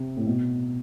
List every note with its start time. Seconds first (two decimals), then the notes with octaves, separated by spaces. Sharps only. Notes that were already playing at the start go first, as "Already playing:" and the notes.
Already playing: C3
0.17 A2
0.27 B2